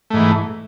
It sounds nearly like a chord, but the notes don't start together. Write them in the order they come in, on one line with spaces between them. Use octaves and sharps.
A3 G#2 E3